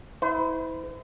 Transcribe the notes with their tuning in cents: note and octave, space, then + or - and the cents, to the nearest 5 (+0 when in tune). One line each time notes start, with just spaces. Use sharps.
E4 -30 C5 -45